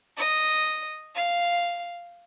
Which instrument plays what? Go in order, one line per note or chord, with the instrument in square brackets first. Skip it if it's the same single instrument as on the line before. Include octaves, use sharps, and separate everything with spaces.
[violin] D#5
F5